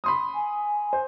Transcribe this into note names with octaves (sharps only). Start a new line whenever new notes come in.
B5 C6 D#6
G#5
C5